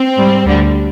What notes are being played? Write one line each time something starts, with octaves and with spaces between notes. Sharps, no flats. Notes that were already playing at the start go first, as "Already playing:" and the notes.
Already playing: C4
G#2 G3
D2 D3 G3